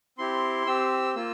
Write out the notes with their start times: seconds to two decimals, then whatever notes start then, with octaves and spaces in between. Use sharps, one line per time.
0.18 C4 E4 G4 C6
0.66 C4 G4 E6
1.15 A#3 F4 E6